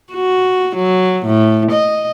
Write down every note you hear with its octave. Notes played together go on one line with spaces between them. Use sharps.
F#4
F#3
A2
D#5